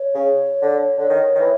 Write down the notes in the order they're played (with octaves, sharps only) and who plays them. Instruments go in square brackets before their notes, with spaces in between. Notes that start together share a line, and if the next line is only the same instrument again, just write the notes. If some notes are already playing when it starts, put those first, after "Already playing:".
Already playing: [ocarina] C#5
[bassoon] C#3
D3
D3
D#3
D#3
E3